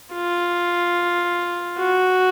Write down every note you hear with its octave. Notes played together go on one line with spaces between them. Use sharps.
F4
F#4